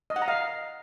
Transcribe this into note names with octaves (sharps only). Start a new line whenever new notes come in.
D#5
F#5
A#5
F5